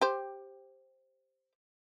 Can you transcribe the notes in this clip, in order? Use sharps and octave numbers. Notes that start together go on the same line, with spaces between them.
G4 C5